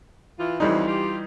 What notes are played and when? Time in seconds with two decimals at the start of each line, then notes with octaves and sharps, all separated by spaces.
0.38 E3 F4
0.60 F2 A2 E3 F3 G3 D#4
0.86 F4 G4